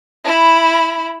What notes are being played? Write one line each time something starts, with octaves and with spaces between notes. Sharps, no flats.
E4 B5